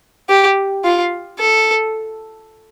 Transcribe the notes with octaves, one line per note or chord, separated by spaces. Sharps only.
G4
F4
A4